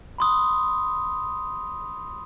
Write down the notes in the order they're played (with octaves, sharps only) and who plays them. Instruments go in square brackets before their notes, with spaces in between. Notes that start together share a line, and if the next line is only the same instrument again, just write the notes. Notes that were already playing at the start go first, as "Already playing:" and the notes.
[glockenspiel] B5 C6 D#6